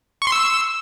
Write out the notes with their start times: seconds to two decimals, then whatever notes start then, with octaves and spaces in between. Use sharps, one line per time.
0.22 C#6
0.27 C6
0.32 E6